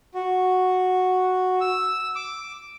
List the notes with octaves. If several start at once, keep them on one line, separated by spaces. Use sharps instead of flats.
F#4
E6
D6